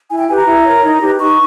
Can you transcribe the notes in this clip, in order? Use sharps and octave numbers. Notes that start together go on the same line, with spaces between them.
E4 G#5
G5
G4 B4 G#5
A#5
E4
A#4 C#5
D#4
G4 B4
D#4 C#6